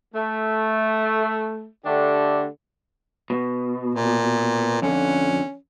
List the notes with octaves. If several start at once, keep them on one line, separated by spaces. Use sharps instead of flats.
A3
D3 A3 D4 G4
B2
A#2
F2 D3 C#4